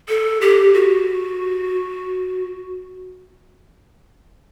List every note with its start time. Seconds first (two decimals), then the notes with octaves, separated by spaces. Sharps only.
0.09 A4
0.41 G4
0.74 F#4